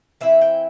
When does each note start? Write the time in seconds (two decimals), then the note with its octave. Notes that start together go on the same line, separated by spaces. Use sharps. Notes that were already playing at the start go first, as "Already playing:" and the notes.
0.21 E3 C4 E4 E5
0.41 G5